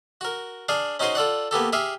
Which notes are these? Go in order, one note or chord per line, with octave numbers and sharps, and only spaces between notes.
F#4 A#4
D4 G#4 F5
C#4 D#4 F#4 G#4 C5 C6
F4 A4 D5 F#5
A#3 B3 G4 A4
G4 G#4 E5 F5